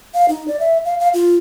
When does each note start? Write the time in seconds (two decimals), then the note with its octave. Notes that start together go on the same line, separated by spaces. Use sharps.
0.14 F5
0.29 D#4
0.48 D5
0.60 E5
0.85 F5
1.00 F5
1.14 F4